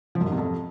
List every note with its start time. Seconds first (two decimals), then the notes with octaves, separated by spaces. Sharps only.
0.15 F3
0.21 F#2
0.26 G#2
0.32 C3
0.38 F2